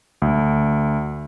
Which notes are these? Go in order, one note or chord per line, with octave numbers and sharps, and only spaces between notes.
D2